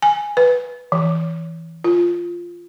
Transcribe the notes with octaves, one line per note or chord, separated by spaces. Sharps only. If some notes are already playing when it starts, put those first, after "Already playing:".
G#5
B4
E3
F4